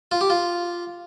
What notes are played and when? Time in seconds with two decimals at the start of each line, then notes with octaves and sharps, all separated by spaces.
0.11 F4
0.21 G4
0.30 F4